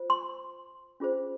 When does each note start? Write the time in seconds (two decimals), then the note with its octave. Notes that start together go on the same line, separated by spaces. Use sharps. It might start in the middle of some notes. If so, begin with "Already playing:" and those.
Already playing: F4 C5
0.10 C6
1.00 C#4 F4 G#4 C5